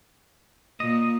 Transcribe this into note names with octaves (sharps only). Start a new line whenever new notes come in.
A#2 D#5